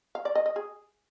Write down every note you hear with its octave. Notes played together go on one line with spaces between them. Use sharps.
F5
D5
D#5
D#5
G#4